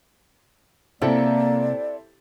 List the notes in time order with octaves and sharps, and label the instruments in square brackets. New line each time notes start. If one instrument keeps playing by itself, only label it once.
[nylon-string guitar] C3 [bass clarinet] A#3 [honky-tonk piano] C4 E4 A4 [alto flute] D5